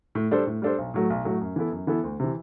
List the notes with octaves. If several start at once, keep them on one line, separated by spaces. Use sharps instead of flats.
A2
G3 D4 A4 C5
A2
G3 D4 A4 C5
B1
A2 F#3 A3
B1
A2 F#3 A3
F#2
E3 B3 E4 A4
F#2
E3 B3 E4 A4
D2
C3 E3